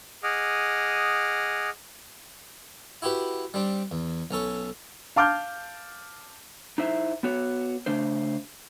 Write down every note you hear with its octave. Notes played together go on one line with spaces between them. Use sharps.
G#4 D#5 F#5 D6 D#6 F6
E4 F#4 G4 B4 F#5
G3 C4 D4
E2
B1 C#4 A4 C#6
F5 A5 D6 F6 G6
D#4 E4 C5 E5
B3 F#4 C#5
C#3 A3 D4 C5